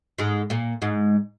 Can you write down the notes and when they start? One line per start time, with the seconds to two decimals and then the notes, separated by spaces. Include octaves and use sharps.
0.18 G#2 G#3
0.50 A#2 A#3
0.82 G#2 G#3